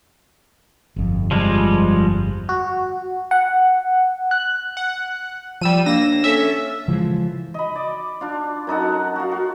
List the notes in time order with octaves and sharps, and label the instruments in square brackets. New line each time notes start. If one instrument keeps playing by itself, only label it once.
[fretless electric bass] G1 F2
[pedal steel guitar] F3 G3 G#3
[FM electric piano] F#4
F#5
F#6
[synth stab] F#5
[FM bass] F3 [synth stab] G3 E6 D#7
[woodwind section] D#2 A#3 [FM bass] D4 [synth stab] A#6 E7
[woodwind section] C#4 A4 [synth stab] E5
[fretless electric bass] C#3 E3 F3 G#3
[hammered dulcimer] D#5 B5
D5
D4 F4
F#2 D#4 A4 F#5
F4 F#4
F#4